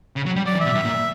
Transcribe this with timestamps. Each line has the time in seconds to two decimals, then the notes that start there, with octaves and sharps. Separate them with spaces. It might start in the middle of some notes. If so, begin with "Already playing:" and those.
0.16 C#3
0.26 F#3
0.36 G3
0.46 F#3 D5
0.55 E3
0.60 B2 E5
0.75 G2
0.85 A#2